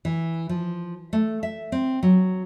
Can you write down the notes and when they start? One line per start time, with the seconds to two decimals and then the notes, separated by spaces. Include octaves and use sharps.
0.05 E3
0.49 F3
1.13 A3
1.43 E5
1.72 C4
2.03 F#3